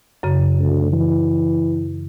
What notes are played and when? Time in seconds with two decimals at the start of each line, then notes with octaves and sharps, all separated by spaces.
0.23 F#2 C#3
0.59 D2
0.92 E3